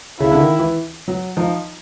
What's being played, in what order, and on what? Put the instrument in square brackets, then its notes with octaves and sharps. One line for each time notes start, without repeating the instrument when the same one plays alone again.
[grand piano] C#3 [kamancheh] E4
[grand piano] D3
D#3
E3
F#3
[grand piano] F3 [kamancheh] D#4